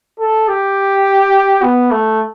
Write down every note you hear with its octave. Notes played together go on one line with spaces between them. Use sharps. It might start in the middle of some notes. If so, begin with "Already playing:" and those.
A4
G4
B3
A3